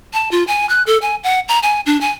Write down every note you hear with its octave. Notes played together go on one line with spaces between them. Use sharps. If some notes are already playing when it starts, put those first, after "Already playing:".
A5
F4
G#5
F#6
A4
G#5
F#5
A#5
G#5
D4
G#5